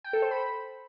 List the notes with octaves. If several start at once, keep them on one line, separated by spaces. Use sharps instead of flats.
G5
A4
C5
B5